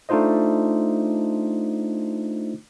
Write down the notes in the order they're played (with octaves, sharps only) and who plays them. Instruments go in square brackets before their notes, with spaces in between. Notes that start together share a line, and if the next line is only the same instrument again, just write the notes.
[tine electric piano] A3 D4 D#4 F4 C5 D#5